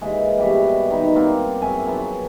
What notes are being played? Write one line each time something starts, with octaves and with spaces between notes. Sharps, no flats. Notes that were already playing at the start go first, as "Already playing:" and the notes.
A#2 E3 G#3
B2 E3 G3
D#3 D#4 B5
A#3 C4 D5
F#2 G#4 E5 G#5
F3 F#3 B3